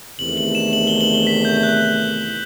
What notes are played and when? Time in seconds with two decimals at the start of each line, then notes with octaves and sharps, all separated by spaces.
0.19 E2 C3 D#3 A3 F#7
0.37 F#7
0.55 E7
0.73 F#7
0.87 G7
1.01 F#7
1.14 G7
1.27 B6
1.45 G6
1.57 G6
1.63 F#6